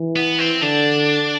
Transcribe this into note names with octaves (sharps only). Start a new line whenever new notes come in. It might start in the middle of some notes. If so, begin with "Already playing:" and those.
Already playing: E3
B3
C4
D3 D4